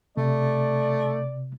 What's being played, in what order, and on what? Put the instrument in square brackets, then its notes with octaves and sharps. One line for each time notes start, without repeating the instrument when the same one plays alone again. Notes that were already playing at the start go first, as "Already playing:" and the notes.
[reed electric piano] C3 [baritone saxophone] A3 [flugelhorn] D5